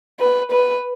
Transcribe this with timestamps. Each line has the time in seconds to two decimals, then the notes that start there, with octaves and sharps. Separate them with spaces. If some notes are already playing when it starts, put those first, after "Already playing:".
0.20 B4
0.52 B4